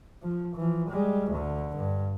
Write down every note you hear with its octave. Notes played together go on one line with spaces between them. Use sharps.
F3
E3 F3
G3 G#3
D2 D3
G2